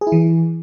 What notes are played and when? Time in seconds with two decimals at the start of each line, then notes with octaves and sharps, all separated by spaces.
0.01 G#4
0.07 E4
0.12 E3